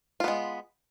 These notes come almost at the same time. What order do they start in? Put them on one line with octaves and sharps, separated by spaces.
F4 B3 G#3